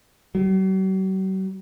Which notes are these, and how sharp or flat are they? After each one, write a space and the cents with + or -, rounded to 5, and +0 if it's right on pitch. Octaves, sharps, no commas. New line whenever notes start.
F#3 +45